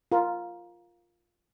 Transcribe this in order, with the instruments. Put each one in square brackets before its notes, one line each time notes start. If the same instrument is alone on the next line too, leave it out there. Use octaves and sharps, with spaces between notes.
[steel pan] F4 A#4